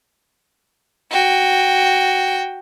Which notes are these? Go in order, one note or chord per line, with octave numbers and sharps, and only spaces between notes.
F#4 G5